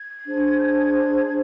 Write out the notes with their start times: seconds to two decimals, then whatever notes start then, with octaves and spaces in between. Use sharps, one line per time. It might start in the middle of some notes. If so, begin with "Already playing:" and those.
Already playing: G#6
0.26 D4 G#4 C5
0.57 G6
0.63 G#6
1.26 G#6